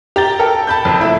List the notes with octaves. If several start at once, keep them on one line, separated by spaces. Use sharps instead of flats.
G4 A#5 A6 G7
A4 A#4 G5
A5 B5 G6
F#1 F2
A3 E4